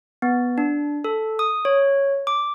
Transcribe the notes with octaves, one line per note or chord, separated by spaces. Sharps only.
B3
D4
A4
D#6
C#5
D6